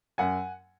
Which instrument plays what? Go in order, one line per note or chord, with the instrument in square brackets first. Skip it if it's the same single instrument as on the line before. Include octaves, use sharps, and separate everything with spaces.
[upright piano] F#2 F#5 G#5